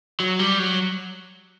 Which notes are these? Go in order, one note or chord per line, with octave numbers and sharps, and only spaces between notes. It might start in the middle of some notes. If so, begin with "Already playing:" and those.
F#3
G3
F#3